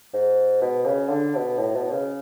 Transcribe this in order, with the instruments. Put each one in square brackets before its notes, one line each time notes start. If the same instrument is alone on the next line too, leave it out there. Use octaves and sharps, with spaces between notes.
[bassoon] G#2
B2
C#3
D3
B2
A2
B2
C#3